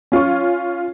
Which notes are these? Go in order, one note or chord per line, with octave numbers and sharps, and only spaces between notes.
C#4 F4 C#5 C#6